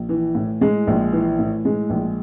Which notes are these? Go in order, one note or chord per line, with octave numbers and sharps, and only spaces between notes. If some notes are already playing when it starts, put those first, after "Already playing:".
Already playing: A#1
E3
A2
G#3
A#1
E3
A2
G#3
A#1